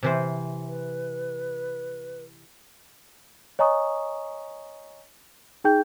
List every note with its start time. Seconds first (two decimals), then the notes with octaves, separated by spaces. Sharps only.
0.03 C3 E3 C5
0.66 B4
3.59 C#5 D#5 G#5 A#5 C#6 D#6
5.64 D#4 G#4 G5 G6